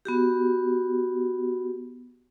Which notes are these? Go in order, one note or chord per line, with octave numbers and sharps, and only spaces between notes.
B3 F#4 G4